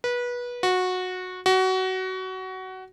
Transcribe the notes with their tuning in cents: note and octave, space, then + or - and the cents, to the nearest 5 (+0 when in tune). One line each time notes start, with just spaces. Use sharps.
B4 -25
F#4 -15
F#4 +20